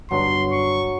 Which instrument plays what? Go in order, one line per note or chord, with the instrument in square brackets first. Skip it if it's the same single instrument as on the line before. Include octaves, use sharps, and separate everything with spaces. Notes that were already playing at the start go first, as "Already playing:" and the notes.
[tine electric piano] G1 G2 D4 [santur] F#3 [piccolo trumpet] C6
[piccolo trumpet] C#6